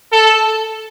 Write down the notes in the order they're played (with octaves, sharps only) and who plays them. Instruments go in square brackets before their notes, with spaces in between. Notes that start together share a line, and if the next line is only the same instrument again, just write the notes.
[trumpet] A4